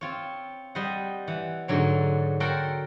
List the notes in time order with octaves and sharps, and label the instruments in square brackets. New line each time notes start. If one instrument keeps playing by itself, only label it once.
[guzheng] C4 F4 C#5
G3 C5 D#5 F#5
E3 F#5
G#2 D3 F#3 C#5
F#4 A4 A#4 C5 F#5 G5